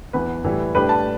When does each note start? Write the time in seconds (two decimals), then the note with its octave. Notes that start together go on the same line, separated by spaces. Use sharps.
0.13 E2 E3 B3 B4
0.44 A2 E3 G3 E4
0.75 A2 G3 D4 G4 B4
0.89 A5